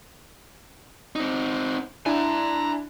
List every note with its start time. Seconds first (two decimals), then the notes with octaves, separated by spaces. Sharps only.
1.16 C4 D#4
2.06 D4 E4 G#5 A#5